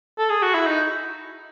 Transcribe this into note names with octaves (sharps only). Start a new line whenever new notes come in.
A4
G#4
F#4
E4
D#4